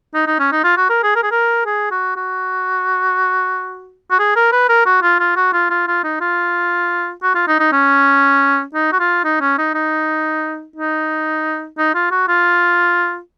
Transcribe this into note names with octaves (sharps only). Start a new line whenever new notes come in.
D#4
D#4
C#4
D#4
F4
F#4
A#4
G#4
A#4
G#4
A#4
G#4
F#4
F#4
F#4
G#4
A#4
B4
A#4
F#4
F4
F4
F#4
F4
F4
F4
D#4
F4
F#4
F4
D#4
D#4
C#4
D#4
F#4
F4
D#4
C#4
D#4
D#4
D#4
D#4
F4
F#4
F4